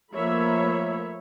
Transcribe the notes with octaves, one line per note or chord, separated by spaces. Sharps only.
F3 A3 A#3 C#5 E5 B5